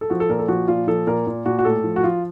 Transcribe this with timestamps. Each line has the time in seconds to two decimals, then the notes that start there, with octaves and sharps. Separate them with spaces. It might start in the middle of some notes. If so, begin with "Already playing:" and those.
0.01 A4
0.10 F3 F#4
0.20 A4
0.29 A#2 A#4
0.39 A4
0.48 F3 F#4
0.68 A#2 F4
0.87 F3 A4
1.07 A#2 A#4
1.27 A#2
1.46 A#2 F#4
1.59 F#4
1.65 A2 A4
1.84 F3
1.96 F#4
2.03 F3 F4